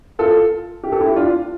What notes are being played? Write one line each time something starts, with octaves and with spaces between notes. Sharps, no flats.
F4 A4
G4
A4
E4 G4
D4 F4